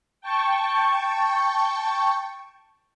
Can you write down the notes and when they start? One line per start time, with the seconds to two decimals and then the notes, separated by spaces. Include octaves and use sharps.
0.21 G5 A5 C#6